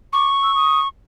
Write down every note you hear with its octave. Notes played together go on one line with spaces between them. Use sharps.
C#6 D6
E6
D#6